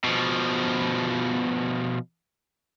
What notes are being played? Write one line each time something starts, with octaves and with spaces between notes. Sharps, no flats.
B2 F3